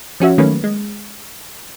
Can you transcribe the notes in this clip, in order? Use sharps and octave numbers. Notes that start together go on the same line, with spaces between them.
F3 C#4 F#4 E5
D#3 F#3 A3 A#3 C#4 B4
G#3